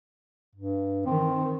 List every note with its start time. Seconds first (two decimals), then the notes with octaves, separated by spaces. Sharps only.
0.56 G2
1.06 D#3 C4